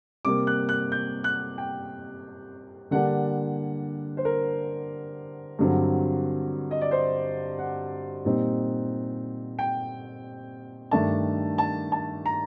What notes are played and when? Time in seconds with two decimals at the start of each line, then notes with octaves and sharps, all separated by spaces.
0.25 C3 G3 A#3 D6
0.47 F#6
0.69 F#6
0.92 G6
1.24 F#6
1.58 G5
2.91 D3 G3 A#3 D4 F#5
4.17 C5
4.25 A#4
5.59 G2 D3 F#3 C4
6.71 D#5
6.81 D5
6.91 C5
7.59 F#5
8.25 A#2 G3 C4 D#4
9.59 G5
10.91 G2 D#3 A3 D4 A5
11.58 A5
11.92 A5
12.26 A#5